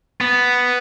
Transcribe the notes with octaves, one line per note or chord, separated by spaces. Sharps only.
B3